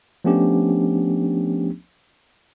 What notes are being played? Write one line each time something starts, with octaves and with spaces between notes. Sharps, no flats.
F3 A3 B3 C#4 D4 G4